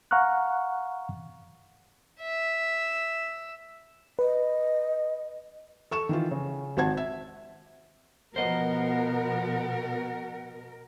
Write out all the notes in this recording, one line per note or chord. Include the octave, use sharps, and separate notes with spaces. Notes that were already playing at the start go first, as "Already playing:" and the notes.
F5 F#5 A#5 C#6 F6 F#6
E5
B4 D#5
A4 C#6 E7
D#3 E3 F4
C#3
G#1 C4 C5 F#5 A5 G#6
E5
B2 F3 B3 A#4 C5 D#5 F#5